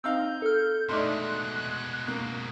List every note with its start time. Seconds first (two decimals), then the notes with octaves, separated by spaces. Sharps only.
0.04 C4 D#4 F5 E6 G6
0.42 A4 F6
0.89 B2 G#3 A3 D#4 D5 C6 F#6
2.08 A#3